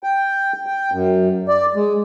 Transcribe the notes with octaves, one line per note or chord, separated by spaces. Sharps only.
G5
G5
F#2
D5
G#3